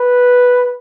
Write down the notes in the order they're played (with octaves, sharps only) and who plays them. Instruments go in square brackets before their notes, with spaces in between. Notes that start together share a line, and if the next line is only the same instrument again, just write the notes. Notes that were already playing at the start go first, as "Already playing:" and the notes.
Already playing: [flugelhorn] B4